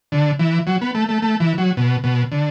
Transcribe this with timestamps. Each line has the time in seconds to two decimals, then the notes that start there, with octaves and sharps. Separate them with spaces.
0.12 D3
0.39 E3
0.67 F#3
0.81 B3
0.95 A3
1.09 A3
1.22 A3
1.40 E3
1.58 F#3
1.77 B2
2.04 B2
2.32 D3